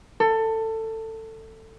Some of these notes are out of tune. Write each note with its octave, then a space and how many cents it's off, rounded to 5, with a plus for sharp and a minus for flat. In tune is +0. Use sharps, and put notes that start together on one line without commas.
A4 +20